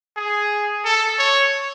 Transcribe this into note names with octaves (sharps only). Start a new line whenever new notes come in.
G#4
A4
C#5